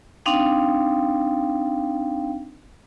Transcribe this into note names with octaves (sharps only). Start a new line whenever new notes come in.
C4 D4 D#4 F5 G5